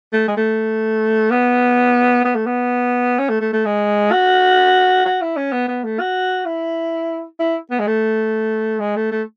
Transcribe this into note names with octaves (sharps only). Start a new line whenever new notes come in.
A3
G#3
A3
B3
B3
A3
B3
C#4
A3
A3
A3
G#3
F#4
F#4
E4
C#4
B3
B3
A3
F#4
E4
E4
B3
G#3
A3
G#3
A3
A3